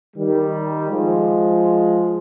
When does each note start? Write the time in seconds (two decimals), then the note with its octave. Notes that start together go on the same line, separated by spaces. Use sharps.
0.17 D#3 G3
0.89 F3 G#3